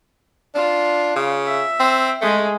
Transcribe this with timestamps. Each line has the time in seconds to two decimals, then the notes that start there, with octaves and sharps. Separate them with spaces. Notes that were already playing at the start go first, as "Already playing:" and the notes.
0.55 D4 F4
1.16 C#3
1.45 E5
1.80 C4
2.22 G#3 A3 G#4